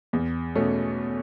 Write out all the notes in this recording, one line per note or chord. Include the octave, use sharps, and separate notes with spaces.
E2
B2 A3 C#4